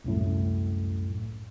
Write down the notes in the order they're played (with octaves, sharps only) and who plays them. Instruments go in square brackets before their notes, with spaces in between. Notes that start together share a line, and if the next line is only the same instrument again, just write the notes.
[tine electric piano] C2 F#2 A2